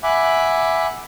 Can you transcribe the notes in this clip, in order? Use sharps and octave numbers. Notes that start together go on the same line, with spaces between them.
E5 F#5 G#5 B5 D6 F#6